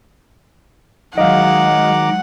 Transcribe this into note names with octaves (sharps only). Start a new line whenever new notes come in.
D#3 F#3 G#3 D#5 F5 F#5 A#5 D6